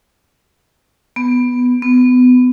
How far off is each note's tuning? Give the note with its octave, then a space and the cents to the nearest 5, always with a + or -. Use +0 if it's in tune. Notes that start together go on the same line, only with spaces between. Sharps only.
B3 +5
B3 +25